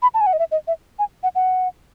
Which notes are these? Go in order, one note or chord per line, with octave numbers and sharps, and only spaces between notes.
B5
A5
G#5
F#5
D#5
E5
D#5
E5
G#5
F#5
F#5